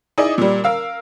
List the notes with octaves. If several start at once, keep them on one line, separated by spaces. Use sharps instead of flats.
D#4 E4 G#4 D5 D#5
A#2 G3
A#4 F5 E6